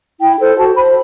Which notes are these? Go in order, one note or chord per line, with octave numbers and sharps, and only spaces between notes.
E4 G5
A4 C5
F#4 A5
C5 B5